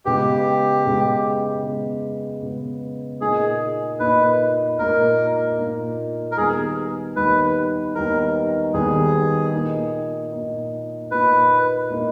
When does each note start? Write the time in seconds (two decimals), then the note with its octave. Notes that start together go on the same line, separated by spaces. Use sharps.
0.05 C#3 G#3 B3 G4
0.84 C#3 G#3 B3
1.63 C#3 G#3 B3
2.42 C#3 G#3 B3
3.21 A#2 A#3 D#4 G#4
4.00 A#2 A#3 D#4 B4
4.79 A#2 A#3 D#4 A#4
5.59 A#2 A#3 D#4
6.32 A#4
6.37 D#2 D#3 G3 B3 D#4 G#4
7.16 D#2 D#3 G3 B3 D#4 B4
7.95 D#2 D#3 G3 B3 D#4 A#4
8.74 D#2 D#3 G3 B3 D#4 G#4
9.53 A#2 A#3 D#4
10.32 A#2 A#3 D#4
11.11 A#2 A#3 D#4 B4
11.90 A#2 A#3 D#4